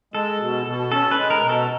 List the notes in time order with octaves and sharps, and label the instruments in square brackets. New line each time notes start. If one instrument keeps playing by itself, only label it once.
[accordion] G#3 [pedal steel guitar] A4
[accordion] B2
B2
[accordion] C#4 [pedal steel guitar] A4
[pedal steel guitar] B4
[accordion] G#3
[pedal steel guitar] A#4
[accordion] B2
[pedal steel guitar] A4